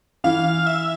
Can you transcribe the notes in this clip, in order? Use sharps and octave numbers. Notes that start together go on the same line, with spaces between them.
E3 F5
E5